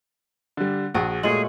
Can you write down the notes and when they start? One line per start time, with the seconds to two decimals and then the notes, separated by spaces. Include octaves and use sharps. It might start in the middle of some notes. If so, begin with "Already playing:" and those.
0.57 D3 G3
0.94 A#1 F#4 G#4
1.23 A#2 G#3 A3 G#4 C#5 F#7